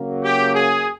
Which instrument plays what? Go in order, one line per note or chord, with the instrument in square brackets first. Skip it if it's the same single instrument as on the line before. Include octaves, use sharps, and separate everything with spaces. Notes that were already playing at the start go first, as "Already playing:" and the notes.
Already playing: [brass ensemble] C#3 F#3 A#3
[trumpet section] G4
G#4